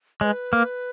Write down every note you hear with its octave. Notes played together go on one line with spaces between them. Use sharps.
G#3 B4 C#5
A#3